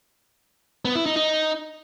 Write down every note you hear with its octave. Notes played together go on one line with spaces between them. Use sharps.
B3
E4
D#4
D#4